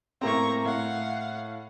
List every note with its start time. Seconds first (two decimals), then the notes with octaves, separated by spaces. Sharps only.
0.21 A2 A#3 C4 A#5 C#6
0.65 A2 F5 F#5